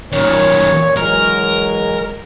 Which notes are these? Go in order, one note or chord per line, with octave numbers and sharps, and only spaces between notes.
F#2 A#2 D#3 C#5
E3 F#3 G#3 A#4